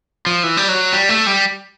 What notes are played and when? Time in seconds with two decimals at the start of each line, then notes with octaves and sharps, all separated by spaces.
0.26 F3
0.43 E3
0.57 G3
0.69 F#3
0.93 G3
1.09 A3
1.27 G3